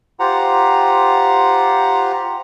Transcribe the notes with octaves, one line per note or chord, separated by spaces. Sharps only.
F4 G4 C5 F#5 A#5